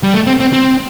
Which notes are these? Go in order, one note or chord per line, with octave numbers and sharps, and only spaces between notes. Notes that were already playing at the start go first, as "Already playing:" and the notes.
G3
A3
C4
C4
C4